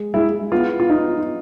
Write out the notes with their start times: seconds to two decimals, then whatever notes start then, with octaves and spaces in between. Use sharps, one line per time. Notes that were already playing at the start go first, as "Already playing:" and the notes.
Already playing: G#3
0.14 G#3 E4
0.52 B3 F4
0.80 F4
0.90 D#4